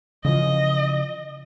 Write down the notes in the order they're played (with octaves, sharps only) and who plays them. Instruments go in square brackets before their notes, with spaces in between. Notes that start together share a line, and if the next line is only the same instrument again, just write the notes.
[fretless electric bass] C#3 E3 F3 [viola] D#5